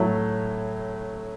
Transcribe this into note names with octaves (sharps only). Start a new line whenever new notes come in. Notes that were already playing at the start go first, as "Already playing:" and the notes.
Already playing: A2 F#3 A3